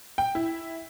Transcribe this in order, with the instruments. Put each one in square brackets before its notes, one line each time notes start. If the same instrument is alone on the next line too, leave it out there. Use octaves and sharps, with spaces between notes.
[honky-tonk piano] G5
E4